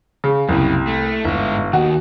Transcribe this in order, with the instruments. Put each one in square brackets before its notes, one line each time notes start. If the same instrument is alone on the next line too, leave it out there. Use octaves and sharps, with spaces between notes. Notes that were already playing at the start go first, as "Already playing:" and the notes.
[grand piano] C#3
[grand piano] C2 [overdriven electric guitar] F#2 C#3
[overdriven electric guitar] A3
[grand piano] G1 [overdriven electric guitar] G#2 E5
[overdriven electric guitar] D#2 D#3 [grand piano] F#4